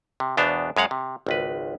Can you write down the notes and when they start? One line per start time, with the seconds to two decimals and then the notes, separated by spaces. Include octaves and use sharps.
0.20 C3
0.37 E2 B2 B3 D4 C5 F5
0.77 F#2 G#3 F5 F#5
0.91 C3
1.27 G#1 C#2 B4